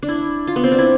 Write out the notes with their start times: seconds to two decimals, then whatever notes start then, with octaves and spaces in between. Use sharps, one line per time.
0.03 D4
0.08 E4
0.47 F4
0.56 B3
0.64 C4
0.72 D4
0.79 E4